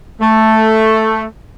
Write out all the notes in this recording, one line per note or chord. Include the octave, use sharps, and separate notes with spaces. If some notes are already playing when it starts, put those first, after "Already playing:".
A3